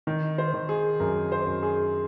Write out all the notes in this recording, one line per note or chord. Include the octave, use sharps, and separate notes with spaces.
D#3
C5
D#3
G#4
F#2 A#4
C5
F#2
G#4